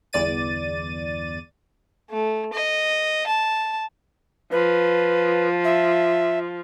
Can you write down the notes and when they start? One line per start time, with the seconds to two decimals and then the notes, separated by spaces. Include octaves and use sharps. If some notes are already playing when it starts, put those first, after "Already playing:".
0.13 G1 E2 D5 A6 D#7
2.11 A3
2.53 D#5
3.27 A5
4.52 F3 B4
5.65 E5